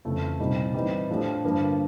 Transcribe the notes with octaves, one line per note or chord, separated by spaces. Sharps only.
F2 C#3 E3 A3
C2 A#2 G3 C4 D#4
E3 G3 C4 D#4
A2 F3 A3 D4 G4
G2 D3 F3 A#3